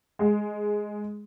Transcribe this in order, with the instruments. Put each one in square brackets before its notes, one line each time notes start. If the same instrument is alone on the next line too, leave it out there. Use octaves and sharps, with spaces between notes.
[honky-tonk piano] G#3